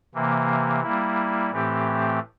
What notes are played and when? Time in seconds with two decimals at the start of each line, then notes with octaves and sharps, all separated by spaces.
0.14 C3 E3 A#3
0.83 G3 A#3 E4
1.51 A2 E3 A3 C4 G4